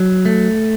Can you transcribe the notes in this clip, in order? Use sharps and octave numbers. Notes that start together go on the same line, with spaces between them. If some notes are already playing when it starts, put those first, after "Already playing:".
Already playing: F#3
A3